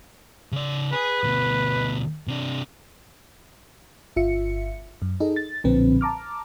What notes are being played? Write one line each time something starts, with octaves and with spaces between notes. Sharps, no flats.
C#3 D5
G#4 B4
D2 B2
C3 D4
G1 F4 E5 C#7
F#2
D#4 G#4 A4 D#5
A6
B1 A#2 D3 F3 C4 B4
A5 A#5 D6 F6